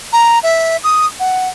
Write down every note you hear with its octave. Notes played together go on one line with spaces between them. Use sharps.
A#5
E5
D#6
F#5